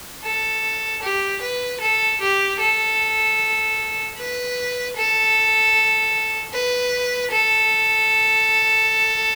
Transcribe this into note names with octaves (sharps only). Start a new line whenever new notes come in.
A4
G4
B4
A4
G4
A4
B4
A4
B4
A4